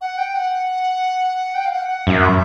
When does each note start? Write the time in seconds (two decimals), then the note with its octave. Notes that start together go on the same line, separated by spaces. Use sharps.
0.01 F#5
0.18 G5
0.35 F#5
1.55 G5
1.65 F5
1.72 F#5
1.89 F#5
2.07 F#2 E5